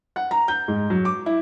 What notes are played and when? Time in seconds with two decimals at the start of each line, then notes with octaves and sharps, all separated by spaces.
0.16 F#5
0.31 A#5
0.48 G6
0.68 G#2
0.90 F#3
1.05 D6
1.26 E4